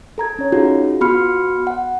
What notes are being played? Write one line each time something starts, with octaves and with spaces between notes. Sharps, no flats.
A4 A#5 G#6
C#4 C#5
D#4 F4 F#4 G#4
F4
B3 F#4 B5 C6 F6 C#7
F#5